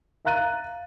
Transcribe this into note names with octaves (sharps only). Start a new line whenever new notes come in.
E5 F5 A#5 F#6 A6 D#7